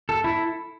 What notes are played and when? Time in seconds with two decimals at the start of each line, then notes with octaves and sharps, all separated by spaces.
0.09 A4
0.24 E4